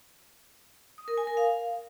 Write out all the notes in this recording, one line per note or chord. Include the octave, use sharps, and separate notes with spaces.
D#6
A#4
G#5
A#4
F5